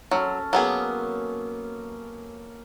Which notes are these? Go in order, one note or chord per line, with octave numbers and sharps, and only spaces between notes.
F#3 C#4 A4
F#3 A#3 B3 G#4